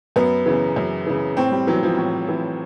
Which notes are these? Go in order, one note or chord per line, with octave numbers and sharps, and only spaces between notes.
F#2 B3
C#3 E3
F#2
C#3 E3
A2 C4
G3
E3 F#3
F3
A2
E3